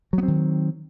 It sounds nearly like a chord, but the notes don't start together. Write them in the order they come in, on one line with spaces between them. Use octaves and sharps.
F#3 B3 C4 D#3